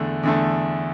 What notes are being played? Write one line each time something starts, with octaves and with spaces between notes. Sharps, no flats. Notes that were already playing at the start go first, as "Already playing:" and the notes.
Already playing: E2 D3 A3
E2 D3 A3